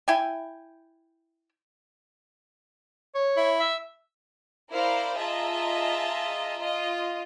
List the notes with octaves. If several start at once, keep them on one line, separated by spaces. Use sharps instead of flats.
E4 G5 G#5
C#5
E4
E5
E4 A#4 C5 D5 F5 A#5
F4 G#4 D#5 E5 A5 A#5
F4 D#5